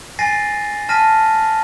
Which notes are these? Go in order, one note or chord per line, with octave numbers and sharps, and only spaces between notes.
G#5 A6 A#6 C7 D#7
A5 F6 A#6 B6 D#7